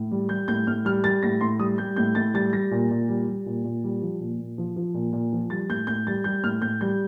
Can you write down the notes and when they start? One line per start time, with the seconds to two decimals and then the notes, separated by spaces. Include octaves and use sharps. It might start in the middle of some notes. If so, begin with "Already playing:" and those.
Already playing: A2
0.11 G3
0.29 G3 G6
0.48 A2 G6
0.67 A2 F6
0.85 G3 F6
1.04 G3 A6
1.23 A2 A#6
1.41 A2 C6
1.59 G3 D#6
1.78 G3 G6
1.96 A2 G6
2.15 A2 A6
2.34 G3 A6
2.53 G3 A#6
2.71 A#2
2.91 A#2
3.09 G3
3.28 G3
3.46 A#2
3.64 A#2
3.84 G3
4.02 F3
4.20 A#2
4.39 A#2
4.58 F3
4.76 F3
4.94 A#2
5.13 A#2
5.32 F3
5.50 G3 A6
5.69 A2 G6
5.87 A2 G6
6.07 G3 A6
6.24 G3 G6
6.43 A2 F6
6.62 A2 G6
6.81 G3 G6